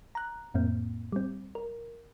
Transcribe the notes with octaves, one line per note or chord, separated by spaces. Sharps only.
A#5 F#6
F2 A2 A#3 C4
G3 C4
A#4